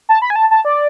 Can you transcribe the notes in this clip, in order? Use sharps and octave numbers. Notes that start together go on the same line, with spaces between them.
A5
B5
G#5
A5
A5
D5